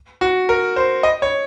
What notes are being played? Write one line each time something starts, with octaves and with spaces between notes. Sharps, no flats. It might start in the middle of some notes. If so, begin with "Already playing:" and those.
F#4
A#4
C5
D#5
C#5